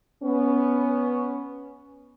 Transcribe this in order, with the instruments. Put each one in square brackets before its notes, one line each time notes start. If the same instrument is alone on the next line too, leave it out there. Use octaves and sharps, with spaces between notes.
[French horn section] B3 C#4